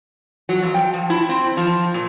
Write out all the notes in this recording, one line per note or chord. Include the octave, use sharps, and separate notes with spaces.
F#3
F2
G5
F3
E4
C4
F3
A#2